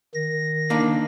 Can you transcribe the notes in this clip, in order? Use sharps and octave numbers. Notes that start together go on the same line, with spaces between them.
D#3 A#6
A#3 D4 D#4